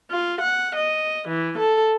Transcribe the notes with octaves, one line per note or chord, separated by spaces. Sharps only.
F4
F#5
D#5
E3
A4